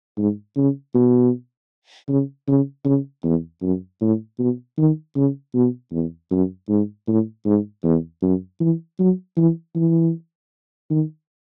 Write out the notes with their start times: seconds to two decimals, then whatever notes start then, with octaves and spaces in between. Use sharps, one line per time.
0.18 G#2
0.57 C#3
0.95 B2
2.09 C#3
2.48 C#3
2.85 C#3
3.24 E2
3.62 F#2
4.01 A2
4.39 B2
4.78 D#3
5.16 C#3
5.55 B2
5.92 E2
6.31 F#2
6.69 G#2
7.08 A2
7.46 G#2
7.84 E2
8.22 F#2
8.60 E3
8.99 F#3
9.37 E3
9.76 E3
10.90 D#3